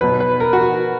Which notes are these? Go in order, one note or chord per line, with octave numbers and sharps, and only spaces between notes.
B2 F#3 B4
B4
A#4
F#4